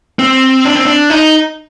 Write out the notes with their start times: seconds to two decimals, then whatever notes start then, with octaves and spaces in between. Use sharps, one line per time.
0.19 C4
0.65 D4
0.75 C4
0.85 D4
1.10 D#4